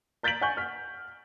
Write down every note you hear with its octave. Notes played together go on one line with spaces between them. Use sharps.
A#5 G6 A6 B6 D7 F#7
F#5 G#5 C#6 G6
F6 B6